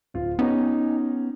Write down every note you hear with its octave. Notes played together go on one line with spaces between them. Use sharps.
D1 F4
B3 C#4 D#4 G4 A#5